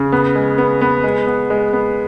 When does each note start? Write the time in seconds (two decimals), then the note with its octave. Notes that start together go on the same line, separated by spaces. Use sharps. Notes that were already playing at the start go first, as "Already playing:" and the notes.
Already playing: C#3
0.12 B3
0.35 G#3
0.58 B3
0.81 B3
1.04 G#3
1.27 B3
1.50 G#3
1.73 B3